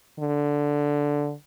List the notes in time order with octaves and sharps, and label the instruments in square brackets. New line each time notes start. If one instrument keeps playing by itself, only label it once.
[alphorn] D3